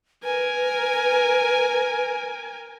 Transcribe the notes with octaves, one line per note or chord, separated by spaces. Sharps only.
A#4 B4 G#5